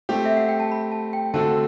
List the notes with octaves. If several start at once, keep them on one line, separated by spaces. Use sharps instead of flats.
A3 C4 G4
E5
F#5
G5
A5
B5
A5
G5
D3 A3 C4 F#4 A4 A5